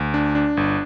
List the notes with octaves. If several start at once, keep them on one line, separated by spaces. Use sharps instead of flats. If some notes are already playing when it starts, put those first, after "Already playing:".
Already playing: D2
D4
D4
G1